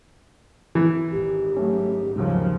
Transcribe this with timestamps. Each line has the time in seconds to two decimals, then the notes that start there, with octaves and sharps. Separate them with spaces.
0.75 E3
1.11 G#1 G4
1.57 F#3 A3 C#4
2.16 D#2 G#2 C#3 F3 F#3